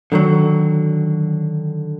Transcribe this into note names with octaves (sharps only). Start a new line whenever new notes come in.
D3 D#3 F3 F#3